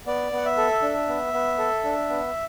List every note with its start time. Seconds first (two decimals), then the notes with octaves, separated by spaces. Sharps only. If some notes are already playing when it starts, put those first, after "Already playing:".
0.07 B3 D5
0.32 B3 F#5
0.45 E5
0.57 A4
0.82 D4
1.08 B3
1.34 B3
1.58 A4
1.84 D4
2.09 B3